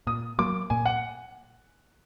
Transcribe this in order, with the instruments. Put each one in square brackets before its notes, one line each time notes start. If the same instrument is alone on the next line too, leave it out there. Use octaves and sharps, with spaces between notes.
[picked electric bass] A#2 [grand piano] D#6
[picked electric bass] F#3 A#3 [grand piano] D6
[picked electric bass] A#2 [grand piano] G#5
[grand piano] F#5